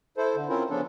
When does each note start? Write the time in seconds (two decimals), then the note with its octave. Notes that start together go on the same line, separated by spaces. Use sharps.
0.17 E4 A4 C5
0.36 D3
0.49 C4 C#4 E4 F4 A#4
0.70 C#3 F3 B3 C#4 D4 A4